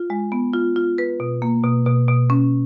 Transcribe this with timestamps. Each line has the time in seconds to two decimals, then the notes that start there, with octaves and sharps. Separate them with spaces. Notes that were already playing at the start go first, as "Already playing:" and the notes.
Already playing: F4
0.10 G#3
0.32 B3
0.54 F4
0.76 F4
0.98 B4
1.20 B2
1.42 A#3
1.64 B2
1.86 B2
2.08 B2
2.30 C#4